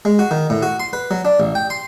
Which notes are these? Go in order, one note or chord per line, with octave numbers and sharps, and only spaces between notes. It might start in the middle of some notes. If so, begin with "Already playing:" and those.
G#3
F#4
D#3
A2
F#4
C6
B4
F#3
D4
A1
G5
C6